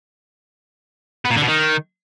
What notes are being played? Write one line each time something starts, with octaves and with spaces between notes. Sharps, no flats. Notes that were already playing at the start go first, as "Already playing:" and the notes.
B3
A#2
D3
B2
D#3